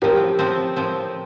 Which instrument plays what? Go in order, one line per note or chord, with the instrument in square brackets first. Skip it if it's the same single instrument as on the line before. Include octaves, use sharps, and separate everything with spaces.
[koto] A2 F3 C4 [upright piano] G4 A#4
[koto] A2 F3 C4
A2 F3 C4